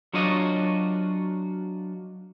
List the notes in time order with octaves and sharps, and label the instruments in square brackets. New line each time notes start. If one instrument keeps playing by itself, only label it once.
[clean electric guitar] F#3 D4 F4 F#4 C#5 D#5